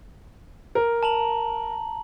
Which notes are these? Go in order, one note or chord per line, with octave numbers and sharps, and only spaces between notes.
A#4
A5 A#5 F#7